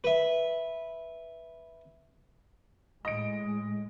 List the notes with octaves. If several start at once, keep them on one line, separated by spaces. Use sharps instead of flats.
B4 E5
A2 G#3 D#5 D7